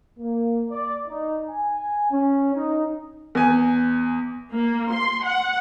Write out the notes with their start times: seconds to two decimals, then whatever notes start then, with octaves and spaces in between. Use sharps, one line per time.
0.19 A#3
0.70 D5
1.07 D#4
1.49 G#5
2.11 C#4
2.54 D#4
3.35 E2 G#5
4.50 A#3
4.91 C6
5.24 F#5